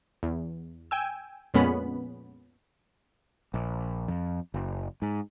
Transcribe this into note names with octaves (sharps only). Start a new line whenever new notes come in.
E2
G5 G#5 E6
F2 A#2 G#3 B3 C#4 B5
A#1
F2
F#1
G#2